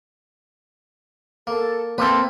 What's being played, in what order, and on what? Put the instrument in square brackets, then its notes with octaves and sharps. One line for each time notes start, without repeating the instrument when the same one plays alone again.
[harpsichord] A#3 [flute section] A4
[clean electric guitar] A#3 C4 A4 [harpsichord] B4 G5 [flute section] C6